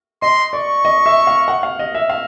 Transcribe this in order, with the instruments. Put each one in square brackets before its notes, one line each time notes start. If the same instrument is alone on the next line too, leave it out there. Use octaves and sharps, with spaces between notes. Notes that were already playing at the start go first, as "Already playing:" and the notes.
[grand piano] D#5 [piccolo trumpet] C6
[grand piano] D5 [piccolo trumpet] C#6
[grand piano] D#5
E5
F5
F#5
F5
D#5
E5
F5